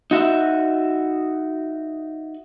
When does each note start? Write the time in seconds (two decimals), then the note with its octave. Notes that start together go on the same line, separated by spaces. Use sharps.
0.11 D#4 F#4 E5